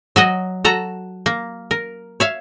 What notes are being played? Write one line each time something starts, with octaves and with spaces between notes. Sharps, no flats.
F#3 F#4 D#5
F#4 A4 A#5
A#3
A#4
C#5 E5 F5